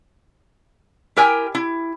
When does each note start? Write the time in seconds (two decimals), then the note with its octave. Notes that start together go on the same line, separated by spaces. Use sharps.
1.16 E4 G4 A#4 G5 G#5
1.55 E4